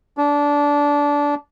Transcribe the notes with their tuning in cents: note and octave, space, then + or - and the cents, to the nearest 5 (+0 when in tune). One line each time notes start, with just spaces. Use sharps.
D4 -20